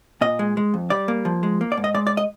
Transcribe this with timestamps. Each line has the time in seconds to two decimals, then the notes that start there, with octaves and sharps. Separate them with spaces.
0.21 A#2 D#5
0.39 G#3
0.57 G#3
0.74 F2
0.90 G3 D5
1.08 A#3
1.25 F3
1.43 G#3
1.61 A#3
1.72 D5
1.77 G#2
1.84 D#5
1.94 G#3 D5
2.07 D5
2.17 D#5